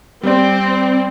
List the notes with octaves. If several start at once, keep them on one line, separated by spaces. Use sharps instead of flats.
G3 C4 D5